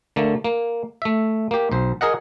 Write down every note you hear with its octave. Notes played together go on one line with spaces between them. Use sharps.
D3 A3 A#3
A#3
A3 E5
A#3 G4
B1 C5
G#4 A#4 D#5 F#5